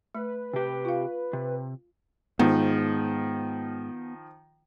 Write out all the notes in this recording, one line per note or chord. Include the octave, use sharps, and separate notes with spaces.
A3 B4
C3 G4
F4 F5
C3
G#2 D#3 F3 B3